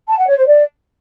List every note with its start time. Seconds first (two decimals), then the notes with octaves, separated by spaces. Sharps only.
0.08 A5
0.18 F#5
0.27 C#5
0.37 C5
0.46 D5